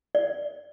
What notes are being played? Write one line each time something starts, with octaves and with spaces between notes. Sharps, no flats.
D5